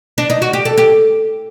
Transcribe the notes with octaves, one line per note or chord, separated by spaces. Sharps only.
D4
D#4
F#4
G4
A4
G4